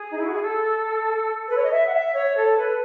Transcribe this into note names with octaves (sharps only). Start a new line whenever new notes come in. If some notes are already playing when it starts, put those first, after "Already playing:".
Already playing: G#4
D#4
E4
F#4
G#4
A4
B4
C#5
D#5
E5
F#5
E5
C#5
A4
B4